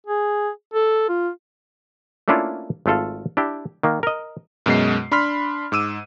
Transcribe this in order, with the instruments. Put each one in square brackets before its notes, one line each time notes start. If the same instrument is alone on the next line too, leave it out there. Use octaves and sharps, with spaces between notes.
[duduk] G#4
A4
F4
[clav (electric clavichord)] A3 A#3 C#4 D4 E4 F4
G#1 A3 F4 A4 F5
D4 E4 G4
D#3 A#3
A#4 D#5
[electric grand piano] F#2 B2 G#3 D#5 C7
D4 B5 C6 F6 B6
G#2 D6 E6 D#7